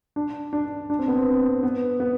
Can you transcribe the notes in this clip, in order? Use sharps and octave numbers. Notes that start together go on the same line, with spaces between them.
D4
D4
D4
C4
B3
C4
B3
B3